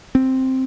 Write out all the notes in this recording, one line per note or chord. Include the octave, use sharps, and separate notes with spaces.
C4